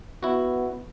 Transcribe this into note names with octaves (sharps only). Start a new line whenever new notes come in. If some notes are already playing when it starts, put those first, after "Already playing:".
B3 E4 F#4